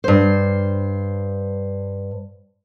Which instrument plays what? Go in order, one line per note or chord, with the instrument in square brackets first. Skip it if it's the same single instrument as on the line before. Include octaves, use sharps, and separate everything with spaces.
[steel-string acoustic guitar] G2 C5